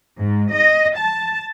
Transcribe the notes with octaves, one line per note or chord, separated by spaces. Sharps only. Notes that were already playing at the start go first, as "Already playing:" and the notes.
G#2
D#5
A5